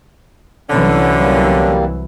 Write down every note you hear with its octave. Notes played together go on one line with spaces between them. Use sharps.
C2 D3 E3 F#3 C#4
G3 A#3